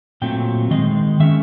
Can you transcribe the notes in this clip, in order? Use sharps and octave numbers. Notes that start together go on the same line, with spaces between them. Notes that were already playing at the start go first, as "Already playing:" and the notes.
A#2 F#3 A3 C4 G5
D#3 G#3 C4 D#5
D#3 G#3 C#4 E5